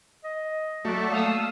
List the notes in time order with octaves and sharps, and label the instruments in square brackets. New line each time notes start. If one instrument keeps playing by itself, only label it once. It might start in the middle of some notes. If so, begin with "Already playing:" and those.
[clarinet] D#5
[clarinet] F#3 [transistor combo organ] A3 [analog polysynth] F#4 D5 E5
[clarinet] A#3 [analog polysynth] F5 D#6 E6